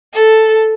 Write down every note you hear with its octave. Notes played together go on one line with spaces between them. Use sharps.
A4